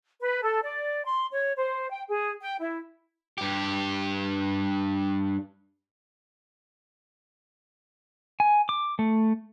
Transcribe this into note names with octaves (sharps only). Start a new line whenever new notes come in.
B4
A4
D5
C6
C#5
C5
G5
G#4
G5
E4
G2 G4
G#5
D6
A3